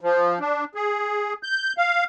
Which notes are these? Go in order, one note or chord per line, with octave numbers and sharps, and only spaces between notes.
F3
D4
G#4
G6
F5